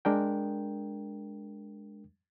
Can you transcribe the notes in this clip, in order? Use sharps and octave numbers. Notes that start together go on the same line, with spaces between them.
G#3 D4 A#4 G5